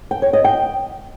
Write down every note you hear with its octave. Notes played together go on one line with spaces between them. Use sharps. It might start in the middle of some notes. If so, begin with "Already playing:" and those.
G5
C#5
D#5
G5